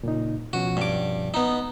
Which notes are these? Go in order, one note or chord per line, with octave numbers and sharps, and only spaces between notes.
A#2 C#3 D#4
B2 F3 C#4 F#4
G2 D6
B3 D#4